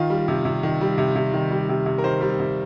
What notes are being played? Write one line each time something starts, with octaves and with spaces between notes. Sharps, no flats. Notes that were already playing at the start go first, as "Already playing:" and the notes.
Already playing: D#3 F4
G3
C3
C3
D#3
G3
C3
C3
D#3
G3
C3
C3
A#4
D#3 C5
G3
C3